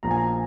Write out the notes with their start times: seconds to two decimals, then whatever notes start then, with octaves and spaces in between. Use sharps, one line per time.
0.03 A#1 A#2 F3 A#5
0.11 G#5
0.18 A#5